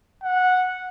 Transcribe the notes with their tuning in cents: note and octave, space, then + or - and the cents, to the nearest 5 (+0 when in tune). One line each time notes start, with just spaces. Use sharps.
F#5 -10